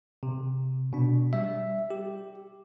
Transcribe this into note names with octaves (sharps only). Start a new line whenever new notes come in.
C3
B2 D4
G3 E5
G4